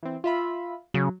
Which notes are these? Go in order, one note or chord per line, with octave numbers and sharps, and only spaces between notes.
E3 C4
F4 E5 B5
C#3 F#3